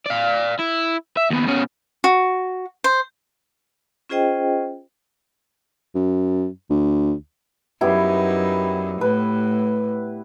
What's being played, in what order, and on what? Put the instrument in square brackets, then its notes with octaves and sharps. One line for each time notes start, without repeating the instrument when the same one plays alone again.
[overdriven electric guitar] D5 F5
E4
E5
D#2 B3
B2 C#4
[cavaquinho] F#4
C5
[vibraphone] C#4 F4 G#4 C5 D#5 G5
[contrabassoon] F#2
D2
[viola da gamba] F#2 D#4 [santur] G3 B3 E4
[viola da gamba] A2 [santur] B4